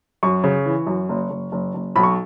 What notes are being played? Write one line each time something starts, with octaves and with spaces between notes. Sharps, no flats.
F#2 C#6
C#3
E3
F#2
F#1
F#1
F#1
F#1
B1 B5
C#6